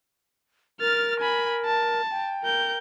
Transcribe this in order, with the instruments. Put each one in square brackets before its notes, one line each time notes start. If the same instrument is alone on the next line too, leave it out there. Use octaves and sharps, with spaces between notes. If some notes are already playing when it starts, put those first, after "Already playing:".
[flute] A#4 [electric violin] F6 A6
[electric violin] G#5 B5
A5
[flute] G5
[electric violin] A#4 G6